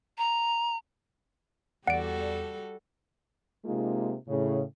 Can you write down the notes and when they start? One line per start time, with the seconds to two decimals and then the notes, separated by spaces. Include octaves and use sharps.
0.18 A#5
1.88 E2 G3 F#4 A4 D5 F#5 D7
3.66 C3 G#3 A#3 D#4 F4
4.29 A2 C#3